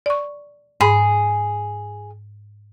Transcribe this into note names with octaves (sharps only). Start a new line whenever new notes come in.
D5 C#6
G#2 G#4 B5